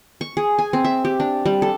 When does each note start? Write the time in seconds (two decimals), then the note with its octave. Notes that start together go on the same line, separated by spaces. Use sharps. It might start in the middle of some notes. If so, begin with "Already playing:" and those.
0.21 C#6
0.37 G#4
0.59 G#5
0.73 C4
0.84 E5
1.05 G4
1.20 D4
1.46 G3
1.62 A4